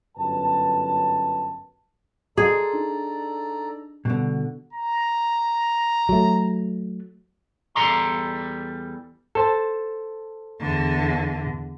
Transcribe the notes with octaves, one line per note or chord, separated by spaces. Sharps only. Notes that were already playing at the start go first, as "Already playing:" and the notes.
G1 F#2 B4 A5
G#4 A4 D5 A#5 C6
D4 D#4
B2 D3 G3
A#5
F#3 A3
E2 G3 A4 D5 A#5 C6
A4 C5 A5
E2 D3